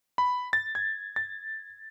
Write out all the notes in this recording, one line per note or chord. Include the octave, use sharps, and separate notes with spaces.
B5
A6
G#6
A6